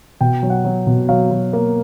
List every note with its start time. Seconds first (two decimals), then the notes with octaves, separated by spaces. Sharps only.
0.21 B2 G5
0.43 F#3
0.50 F#5
0.65 F#3
0.87 B2
1.09 F#3 F5
1.31 F#3
1.53 A#3